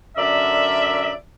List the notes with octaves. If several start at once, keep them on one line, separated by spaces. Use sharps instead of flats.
F#2 D3 A#4 D5 E5